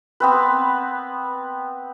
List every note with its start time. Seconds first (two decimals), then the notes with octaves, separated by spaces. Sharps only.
0.20 B3 C4 B4